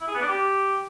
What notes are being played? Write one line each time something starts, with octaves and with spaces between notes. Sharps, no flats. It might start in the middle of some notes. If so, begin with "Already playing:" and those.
E4
G#4
B3
D4
G4